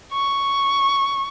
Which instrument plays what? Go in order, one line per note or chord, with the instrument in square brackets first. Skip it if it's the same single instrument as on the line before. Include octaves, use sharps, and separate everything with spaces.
[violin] C#6